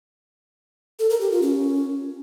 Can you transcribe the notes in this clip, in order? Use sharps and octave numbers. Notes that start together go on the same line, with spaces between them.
A4
A#4
G4
F4
C#4